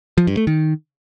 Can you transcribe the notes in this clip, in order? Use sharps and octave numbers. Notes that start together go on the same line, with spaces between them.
F3
G2
A3
D#3